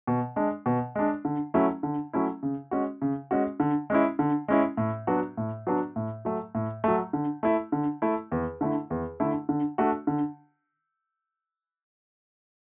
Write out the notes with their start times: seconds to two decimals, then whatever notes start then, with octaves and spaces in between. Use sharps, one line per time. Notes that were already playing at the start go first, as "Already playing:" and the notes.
0.07 B2
0.36 G#3 D4
0.66 B2
0.95 G#3 D4
1.25 D3
1.54 F#3 A3 C#4 E4
1.83 D3
2.13 F#3 A3 C#4 E4
2.43 C#3
2.71 G#3 C#4 F#4
3.02 C#3
3.31 G#3 C#4 F#4
3.60 D3
3.90 G#3 C#4 E4
4.19 D3
4.48 G#3 C#4 E4
4.77 A2
5.07 F#3 B3 D4 F#4
5.37 A2
5.67 F#3 B3 D4 F#4
5.96 A2
6.25 F#3 A3
6.55 A2
6.84 F#3 A3
7.13 D3
7.43 A3 E4
7.72 D3
8.02 A3 E4
8.32 E2
8.61 D3 A3 E4
8.90 E2
9.20 D3 A3 E4
9.49 D3
9.78 A3 D4 F#4
10.07 D3